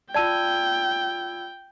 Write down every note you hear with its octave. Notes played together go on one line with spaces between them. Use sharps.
F4 D5 G5 A5 E6 G#6 D#7